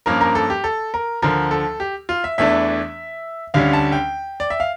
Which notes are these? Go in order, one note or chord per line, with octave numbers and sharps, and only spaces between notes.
G2 F3 A#3 C#4 A#4
A#4
A4
G4
A4
A#4
D2 D3 F3 A#4
A4
G4
F4
E5
E2 E3 A3 D4 E5
D2 D3 G3 C#4 F5
A5
G5
D5
E5
F5